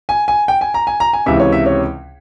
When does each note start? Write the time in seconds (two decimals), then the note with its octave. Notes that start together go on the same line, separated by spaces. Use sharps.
0.09 G#5
0.28 G#5
0.48 G5
0.61 G#5
0.74 A#5
0.87 G#5
1.00 A#5
1.13 G#5
1.26 C#2 C3 E3 E5
1.40 C#5
1.52 E5
1.66 C#5